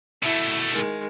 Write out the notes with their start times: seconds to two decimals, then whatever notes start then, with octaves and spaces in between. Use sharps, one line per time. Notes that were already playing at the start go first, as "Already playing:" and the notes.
0.23 B2 A3 E4 E5
0.71 D#3 G#3